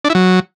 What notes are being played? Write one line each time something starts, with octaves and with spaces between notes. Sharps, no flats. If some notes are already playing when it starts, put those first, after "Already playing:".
D4
E4
F#3